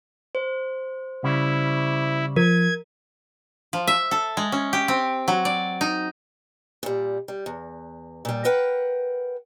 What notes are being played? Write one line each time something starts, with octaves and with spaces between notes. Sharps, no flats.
C5
C#3 G3 E4
F3 A#4 G#6
F3
E5
A4
G#3
C#4
G4
C4
F#3
D5
D#4
A#2 G3
G3
E2
A#2 G3
A#4 B4 F#5 G5